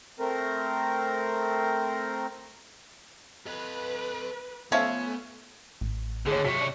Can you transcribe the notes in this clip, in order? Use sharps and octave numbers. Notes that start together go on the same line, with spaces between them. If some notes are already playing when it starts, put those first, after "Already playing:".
A3 C4 A#4
A4 B4 D#5
F3 A3 B3 C#4 E5 F5
A1
D#2 D3 G#4 C#5
C3 F#3 C#5 B6
D4